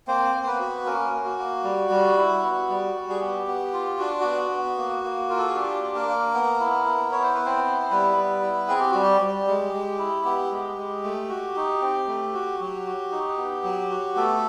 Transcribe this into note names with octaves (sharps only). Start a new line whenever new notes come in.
A#3 C4 C5
A#3
C5
B3 B4
F#4
A#3 C#4 A#4
A#3
F#4
A#3
G3
G3
E4
B3
G3
G3
G#4
B3 G4
B3
F4
D4 F#4
B3 F#4
B3
A#3
A#3
F4 A#4
A4
G#4
D4 G4
A#3
A#3 A#4
A#3
B3
E4
B3
E4 C#5
C5
B3 B4
C4 C5
E4
G3 B3 B4
G3
E4
C4 G#4
G4
G3 F#4
G4
G3
G#3
G#3
E4
B3 G4
G#3
G#3
A3
F#4
D#4
C4
A3
F#4
F#3 G4
F#4
D#4
B3
F#3
F#4
A3 B3 A4